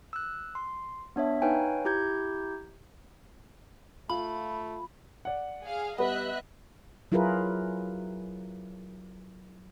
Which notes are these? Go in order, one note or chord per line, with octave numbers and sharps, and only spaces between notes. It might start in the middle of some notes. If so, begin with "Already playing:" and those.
E6 F#6
C6
B3 D4 C#5 E5
D#4 B4 C#5 F5 G5 G#5
E4 G4 A#5 G6 G#6
A3 F4 B5
D5 F#5
G#4 F5
G3 B3 B4 D#5 E5 F#6
F#3 E4 F4 G#4 A#4 B4